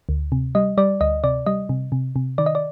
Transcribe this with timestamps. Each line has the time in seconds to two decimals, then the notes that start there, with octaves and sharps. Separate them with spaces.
0.09 D2
0.32 C3
0.55 G3 D#5
0.77 G3 D5
1.01 D2 D#5
1.24 C3 D5
1.46 G3 D#5
1.69 C3
1.92 C3
2.16 C3
2.38 D#3 D5
2.46 D#5
2.55 D5